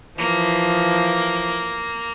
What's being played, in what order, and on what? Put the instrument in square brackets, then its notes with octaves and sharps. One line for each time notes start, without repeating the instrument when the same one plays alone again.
[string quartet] E3 F3 [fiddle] A#3